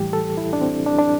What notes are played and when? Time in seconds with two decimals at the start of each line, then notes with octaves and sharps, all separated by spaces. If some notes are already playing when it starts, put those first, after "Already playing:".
Already playing: A2 E3 G3 G4
0.13 A4
0.37 E4
0.53 D4
0.61 C4
0.86 D4
0.98 D4